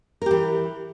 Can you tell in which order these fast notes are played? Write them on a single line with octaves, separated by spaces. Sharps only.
A#4 G4 E3